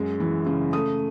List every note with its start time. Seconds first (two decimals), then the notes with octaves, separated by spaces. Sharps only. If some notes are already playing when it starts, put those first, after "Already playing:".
Already playing: F#2 G#3
0.20 E3
0.46 C#3
0.73 A3 D#6